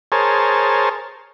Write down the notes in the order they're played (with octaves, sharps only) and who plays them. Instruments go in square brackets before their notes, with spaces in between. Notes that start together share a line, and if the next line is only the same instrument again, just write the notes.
[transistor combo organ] G#4 A#4 C5 C#5 A5